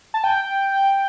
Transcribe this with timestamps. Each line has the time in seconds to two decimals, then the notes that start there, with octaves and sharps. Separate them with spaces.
0.14 A5
0.24 G5